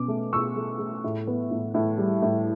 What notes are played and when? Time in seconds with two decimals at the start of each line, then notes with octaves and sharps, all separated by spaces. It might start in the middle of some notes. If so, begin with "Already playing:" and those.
Already playing: B2 C#4 D6
0.08 A3
0.33 B2 C#6 E6
0.56 A3
0.79 A3
1.04 A2
1.27 B3
1.51 A2
1.74 A2
1.98 G3
2.22 A2